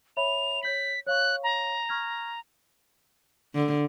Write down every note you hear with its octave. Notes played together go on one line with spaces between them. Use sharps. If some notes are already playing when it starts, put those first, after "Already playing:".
C#5 E5 B5 F7
C#5 G6 B6 F#7
C#5 F5 C#6 F#6
A#5
C#6 F6 G#6
D3